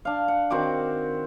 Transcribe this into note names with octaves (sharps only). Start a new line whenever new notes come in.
D4 F5
F#5
D#3 C4 F#4 D6